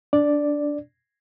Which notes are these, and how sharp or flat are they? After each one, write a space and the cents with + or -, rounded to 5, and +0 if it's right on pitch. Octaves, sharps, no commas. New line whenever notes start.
D4 -15 D5 +0